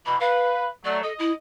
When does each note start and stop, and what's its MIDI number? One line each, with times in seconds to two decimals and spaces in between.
0.06 0.15 47
0.06 0.15 52
0.06 0.18 83
0.20 0.67 71
0.20 0.69 77
0.85 1.02 54
0.85 1.02 57
0.85 1.00 74
1.03 1.13 69
1.03 1.33 75
1.19 1.31 64